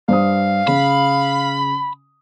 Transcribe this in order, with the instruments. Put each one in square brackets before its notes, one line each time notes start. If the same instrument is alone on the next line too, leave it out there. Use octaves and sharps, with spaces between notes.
[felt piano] G2 C5 D#6 [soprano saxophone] F5
[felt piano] C#3 [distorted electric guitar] B5